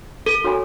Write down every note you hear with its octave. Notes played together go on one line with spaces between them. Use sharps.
A4
F#4 A4 C#5 G#5 B5